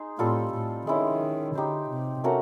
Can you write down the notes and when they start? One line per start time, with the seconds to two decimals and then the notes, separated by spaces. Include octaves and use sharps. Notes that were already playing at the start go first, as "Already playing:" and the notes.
Already playing: D#4 G#4 C5
0.19 A2 G3 C4 F4 A4
0.54 A2
0.87 D#3 G#3 C#4 E4
1.55 D3 D#4 G4 C5
1.90 C3
2.24 A3 C#4 F#4 A#4